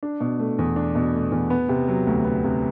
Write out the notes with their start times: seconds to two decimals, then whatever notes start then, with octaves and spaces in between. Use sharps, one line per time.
0.03 D4
0.20 B2
0.39 A3
0.59 E2
0.76 D4
0.95 B2
1.13 A3
1.32 E2
1.50 B3
1.69 C3
1.88 F#3
2.07 D2
2.24 B3
2.44 C3